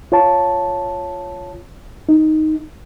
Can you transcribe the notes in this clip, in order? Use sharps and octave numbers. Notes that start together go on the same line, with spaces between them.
F4 C#5 A5
D#4